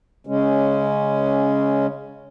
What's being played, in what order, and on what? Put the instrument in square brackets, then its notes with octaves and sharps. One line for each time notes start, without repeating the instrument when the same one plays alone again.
[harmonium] C#3 G#3 C#4